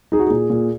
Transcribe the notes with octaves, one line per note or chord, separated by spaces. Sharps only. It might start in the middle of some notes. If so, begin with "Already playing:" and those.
D#4 G#4
F#4
A#2 G#4
A#2